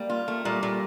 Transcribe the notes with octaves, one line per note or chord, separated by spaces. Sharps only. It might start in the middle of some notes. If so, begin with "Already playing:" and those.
Already playing: G3 A#3
F4
A3
A#2 G3
A#2